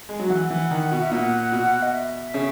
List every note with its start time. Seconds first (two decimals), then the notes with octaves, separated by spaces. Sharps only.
0.09 G#3
0.20 F#3
0.29 E3 F#5
0.50 E3
0.71 D#3
0.91 B2
1.01 E5
1.12 A#2 F#5
1.52 B2
1.82 D#5
1.94 E5
2.34 C#3